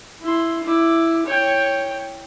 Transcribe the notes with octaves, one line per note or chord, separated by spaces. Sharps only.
E4 C6
E4 D6
C#5 G5